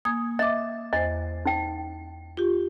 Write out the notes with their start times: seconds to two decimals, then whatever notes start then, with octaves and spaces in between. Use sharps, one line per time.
0.05 A#3 G#5 D#6 G#6
0.39 D#5 E5 D6
0.93 E2 C5 D#5
1.45 D#4 G5
2.37 F4 G4